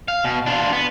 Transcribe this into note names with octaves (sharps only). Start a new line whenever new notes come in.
F5
B2
D4 F4
B3